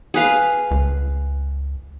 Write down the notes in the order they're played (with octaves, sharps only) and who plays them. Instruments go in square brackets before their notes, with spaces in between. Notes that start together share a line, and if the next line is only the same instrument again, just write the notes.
[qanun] G#4 B4 F5
[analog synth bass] C#2